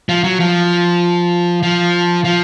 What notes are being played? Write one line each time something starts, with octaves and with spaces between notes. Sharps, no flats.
F3
F#3
F3
F3
F3